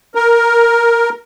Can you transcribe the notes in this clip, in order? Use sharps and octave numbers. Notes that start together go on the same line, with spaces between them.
A#4